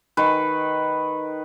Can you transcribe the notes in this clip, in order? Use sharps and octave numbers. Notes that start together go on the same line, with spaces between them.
D#3 B4